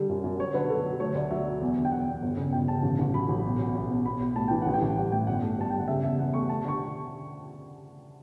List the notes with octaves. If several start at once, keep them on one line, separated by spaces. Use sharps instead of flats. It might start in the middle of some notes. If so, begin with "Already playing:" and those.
Already playing: D3 G3 A4
F#2
F#2
F#3 C#5
D3 B4
F#3 A4
F#3
A3 C#5
D2 D5
F#3 E5
F#3
E2
D3
G5
E2 F#5
E2
G1
C#3
G1 G5
C#3 A5
A1
A1
F#3 B5
A1
B1
B1
B1
B1
B1 B5
B1
A2 A5
E3 G5
A1 F#5
G5
A1
G3 F#5
A2 G5
G1 F#5
A3
G2 A5
G2 G5
F#5
C#3 E5
E2 E5
E2 F#5
A3 C#6
A3 A5
D3 C#6